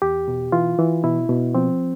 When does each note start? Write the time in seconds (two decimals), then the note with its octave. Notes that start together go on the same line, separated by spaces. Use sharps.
0.02 E2 G4
0.28 B2
0.52 E3 F4
0.79 E3
1.04 B2 E4
1.29 B2
1.55 F3 C4